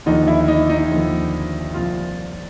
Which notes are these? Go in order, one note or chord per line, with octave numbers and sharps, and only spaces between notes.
D#2 D3 F3 D#4
E4
D#4
D#4
D#2 D3 F3
C2 A#2 F3 F4